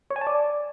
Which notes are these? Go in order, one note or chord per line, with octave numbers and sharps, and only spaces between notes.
C#5
G#5
A5
D5